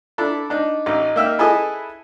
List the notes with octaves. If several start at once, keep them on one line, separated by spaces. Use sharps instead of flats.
D4 E4 A4
D4 D#4
A1 D#4
A#3 D#4 E5 G5 F6
E4 G#4 A4 B4 D#5